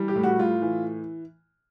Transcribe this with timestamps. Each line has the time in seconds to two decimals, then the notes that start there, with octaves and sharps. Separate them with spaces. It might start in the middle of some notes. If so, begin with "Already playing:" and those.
Already playing: E3 G3
0.08 G4
0.16 A2
0.23 F#4
0.39 A2 F4
0.62 E3